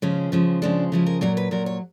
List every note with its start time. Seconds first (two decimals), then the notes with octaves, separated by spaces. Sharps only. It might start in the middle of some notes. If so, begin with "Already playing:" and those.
0.02 C#3 F3 G#3 C#4
0.32 C#3 F3 G#3
0.62 C#3 F3 G#3 D4
0.92 C#3 F3 G#3 E4
1.06 A#4
1.21 A#2 F#3 A#4
1.37 B4
1.51 A#2 F#3 A#4
1.66 C#5